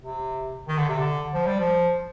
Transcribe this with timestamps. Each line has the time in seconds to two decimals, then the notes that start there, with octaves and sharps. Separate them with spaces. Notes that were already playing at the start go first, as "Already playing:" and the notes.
0.02 C3
0.68 D#3
0.78 D3
0.89 C3
0.98 D3
1.34 F3
1.47 G3
1.60 F3